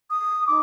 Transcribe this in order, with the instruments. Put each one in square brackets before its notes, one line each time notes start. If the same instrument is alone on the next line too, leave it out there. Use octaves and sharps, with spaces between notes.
[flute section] D#6
D#4 D6